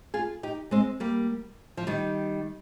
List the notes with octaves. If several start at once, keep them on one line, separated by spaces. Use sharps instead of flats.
F4 G#4
D#4 G4
G#3 C4
G3 A#3
F3
D#3 G3